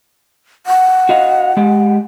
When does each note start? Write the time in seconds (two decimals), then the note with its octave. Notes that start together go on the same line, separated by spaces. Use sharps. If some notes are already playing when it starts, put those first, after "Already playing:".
0.67 F#5
1.09 F#4 D#5 F5
1.57 G#3 G4